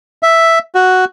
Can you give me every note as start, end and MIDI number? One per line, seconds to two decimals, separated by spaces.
0.23 0.59 76
0.75 1.05 66